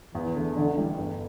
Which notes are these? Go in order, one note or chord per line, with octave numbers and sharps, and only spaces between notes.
E2 E3
D3 A3
A1 D3
A2 E3 G3
G1